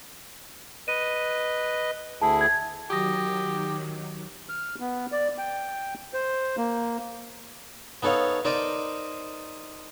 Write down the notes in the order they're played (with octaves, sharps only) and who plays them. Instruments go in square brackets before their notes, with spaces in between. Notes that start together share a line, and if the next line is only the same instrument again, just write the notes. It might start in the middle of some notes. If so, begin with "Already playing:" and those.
[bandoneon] B4 D#5 [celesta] D#7
[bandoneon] D2 E4 G#4 [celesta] A5
[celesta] G#6
[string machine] D#3 F#3 [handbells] F#4 D#6 A#6 [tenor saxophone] G4
[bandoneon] F6
B3
D5
G5
C5
A#3
[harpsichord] B3 D#4 A4 C#5 F5
D#4 A#4 C5 D5 D#5